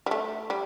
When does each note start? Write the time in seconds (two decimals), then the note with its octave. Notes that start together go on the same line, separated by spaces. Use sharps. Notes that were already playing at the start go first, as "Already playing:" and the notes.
0.06 G3
0.11 A3
0.50 G3